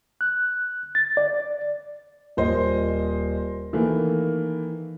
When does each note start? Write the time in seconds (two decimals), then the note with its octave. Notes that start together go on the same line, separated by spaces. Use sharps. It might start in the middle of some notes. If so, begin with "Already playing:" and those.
0.21 F#6
0.95 A6
1.17 D5
2.37 D#1 C5 D#5
3.73 D#3 E3 A3 A#3